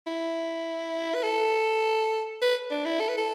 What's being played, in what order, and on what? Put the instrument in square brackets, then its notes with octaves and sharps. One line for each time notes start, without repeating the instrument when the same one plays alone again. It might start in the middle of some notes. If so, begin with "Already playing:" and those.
[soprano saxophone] E4
B4
A4
B4
D4
E4
A4
B4
A4